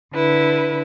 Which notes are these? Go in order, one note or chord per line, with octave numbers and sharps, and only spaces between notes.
D3 E4 B4